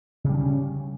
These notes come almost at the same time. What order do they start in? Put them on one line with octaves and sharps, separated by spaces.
C#3 G3 D4 C#4